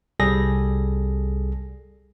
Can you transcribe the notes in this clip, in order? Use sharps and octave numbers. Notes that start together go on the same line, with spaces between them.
C2 G3 G#4 A4 A#6